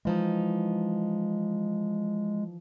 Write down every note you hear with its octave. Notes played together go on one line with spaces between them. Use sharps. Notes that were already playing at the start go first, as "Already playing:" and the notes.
E3 F3 G#3 D#4